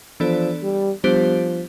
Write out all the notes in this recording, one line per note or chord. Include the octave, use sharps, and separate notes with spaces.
E3 F3 B3 D4 A4 D5
G3
F3 G3 B3 D4 G4 C5